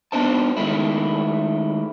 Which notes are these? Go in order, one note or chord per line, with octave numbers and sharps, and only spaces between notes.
B3 D4 D#4 C5 A5
D#3 G#3 A3 E4